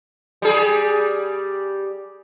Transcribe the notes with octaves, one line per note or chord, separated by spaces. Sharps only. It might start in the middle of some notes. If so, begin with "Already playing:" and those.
G3 G#4